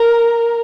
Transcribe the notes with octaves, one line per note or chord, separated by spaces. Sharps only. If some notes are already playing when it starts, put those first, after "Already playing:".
Already playing: A#4